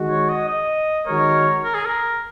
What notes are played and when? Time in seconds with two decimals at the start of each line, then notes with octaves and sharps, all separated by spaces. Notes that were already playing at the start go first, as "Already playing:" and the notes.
Already playing: D#3 G#3 F#4
0.10 C#5
0.29 D#5
0.48 D#5
1.06 D#3 G#3 F#4 A#4 C#5
1.64 A#4
1.75 G#4
1.85 A#4